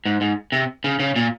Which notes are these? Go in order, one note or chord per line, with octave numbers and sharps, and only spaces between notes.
G#2
G#2
C3
C#3
C#3
A#2